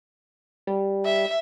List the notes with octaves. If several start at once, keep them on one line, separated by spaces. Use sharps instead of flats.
G3
E5